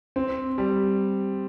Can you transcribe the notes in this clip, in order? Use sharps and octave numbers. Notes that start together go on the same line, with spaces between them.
C4
G3